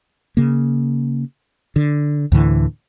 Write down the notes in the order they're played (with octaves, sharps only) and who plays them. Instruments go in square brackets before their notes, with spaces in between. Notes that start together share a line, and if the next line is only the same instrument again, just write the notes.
[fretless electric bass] C#3 A#3
D3
D2 A2 D3 E3